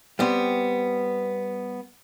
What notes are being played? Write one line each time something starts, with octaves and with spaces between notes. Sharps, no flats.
G3 B3 C4